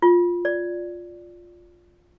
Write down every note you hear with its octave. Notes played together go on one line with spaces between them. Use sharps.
F4
D5